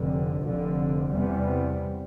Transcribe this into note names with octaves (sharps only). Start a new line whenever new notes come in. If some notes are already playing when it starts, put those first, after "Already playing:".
Already playing: F1 F2 D3
F1 F2 D3
E2 C3 G3 B3